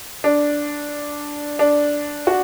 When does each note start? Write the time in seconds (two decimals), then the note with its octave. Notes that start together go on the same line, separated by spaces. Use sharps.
0.24 D4
1.59 D4
2.27 F#4